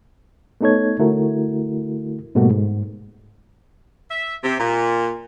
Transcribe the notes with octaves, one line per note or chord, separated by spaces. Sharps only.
A3 B3 D#4 A4 C#5 G#6
D3 A3 E4 F#4 A#4
G#2 B2 G3 A3 A#3 F#4
G#2
E5
C3
A#2